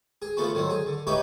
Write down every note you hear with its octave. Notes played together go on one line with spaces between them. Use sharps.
G#4
F3 A3 B3 F#4
D3 D#3 F#3 C4
G#4
D3
D#4 F#4 G4 B4 C#5 E5